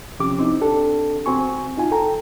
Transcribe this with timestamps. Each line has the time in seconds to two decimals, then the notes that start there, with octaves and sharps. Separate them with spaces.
0.19 C2 C3 F3 C#4 G4 D6
0.39 C4 D#4 E4
0.61 C4 D4 G4 A4
1.26 B2 C4 F#4 G#5 C#6
1.77 D#4 F4 G#5
1.91 A4 G5 A#5